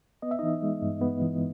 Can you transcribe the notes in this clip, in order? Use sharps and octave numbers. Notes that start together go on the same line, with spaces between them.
B3 D#5
E5
E3 D#4 D#5
G#3
G2
B3
E3